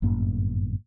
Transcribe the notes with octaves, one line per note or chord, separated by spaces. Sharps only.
G1 F#2 A2 A#3